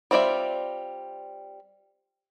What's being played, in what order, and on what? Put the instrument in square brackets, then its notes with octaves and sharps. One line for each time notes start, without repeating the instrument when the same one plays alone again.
[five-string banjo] G3 C4 F4 D5 E5